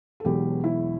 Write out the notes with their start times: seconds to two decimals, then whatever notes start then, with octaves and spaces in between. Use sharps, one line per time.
0.20 A4
0.25 E1 E2 B2 F#3 G4
0.64 E4